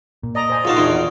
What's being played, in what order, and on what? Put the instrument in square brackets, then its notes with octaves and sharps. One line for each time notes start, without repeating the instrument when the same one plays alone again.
[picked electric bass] A#2
[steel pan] D5 A#5 [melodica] D#5
[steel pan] C5 G#5
[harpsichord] A#1 D#4 A5 [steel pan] F4 F#4 F5
[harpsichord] E2 D#3 D#4 [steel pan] D4 C6